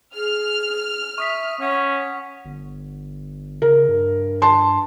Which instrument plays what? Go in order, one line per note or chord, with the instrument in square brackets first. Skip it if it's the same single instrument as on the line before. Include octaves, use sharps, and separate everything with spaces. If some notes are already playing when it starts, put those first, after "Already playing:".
[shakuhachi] G#4 [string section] F6
[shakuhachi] E5 [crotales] C#6 D#6 B6
[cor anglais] C#4 [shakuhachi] F#5 [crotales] D#6
[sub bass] G1
[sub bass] C#3 [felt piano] A#4
[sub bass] G2
[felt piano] A5 C6